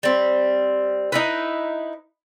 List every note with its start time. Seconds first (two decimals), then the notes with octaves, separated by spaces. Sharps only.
0.03 G3 C4
1.12 D#4 E4 B4